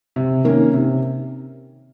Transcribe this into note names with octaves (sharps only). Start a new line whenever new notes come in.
C3
D#3 A#3 C#4
C3